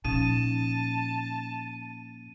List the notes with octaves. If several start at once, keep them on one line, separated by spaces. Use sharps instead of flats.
A#2 F3 C#4 D#4 A5 D#7